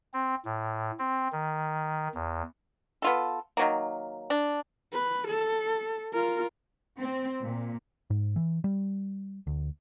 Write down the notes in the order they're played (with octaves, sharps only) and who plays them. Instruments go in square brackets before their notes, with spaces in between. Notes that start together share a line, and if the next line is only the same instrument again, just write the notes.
[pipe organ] C4
A2
C4
D#3
E2
[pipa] B3 F4 A4
D#3 F#3 A#3
D4
[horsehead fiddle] B4
A4
F4 A#4
[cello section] C4
A#2
[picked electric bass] G#2
E3
G3
D2